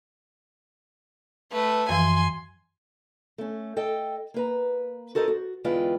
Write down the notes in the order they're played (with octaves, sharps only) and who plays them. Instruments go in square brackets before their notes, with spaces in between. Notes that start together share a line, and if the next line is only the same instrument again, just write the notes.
[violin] A3 B4
[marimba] F#2 E3 F3 [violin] G#5 C6
[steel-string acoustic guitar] A3 C#4
A4 D#5 G5
A#3 B4 A#5
F#4 A4 A#4 C5 D#5
F#4
E2 D3 G#3 F4 B4 G5